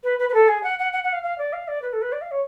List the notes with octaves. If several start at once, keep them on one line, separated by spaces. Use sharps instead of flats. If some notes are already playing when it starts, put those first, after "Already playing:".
B4
B4
B4
A4
G#4
F#5
F#5
F#5
F#5
F5
F5
D5
F5
D5
B4
A4
B4
D5
F5
C#5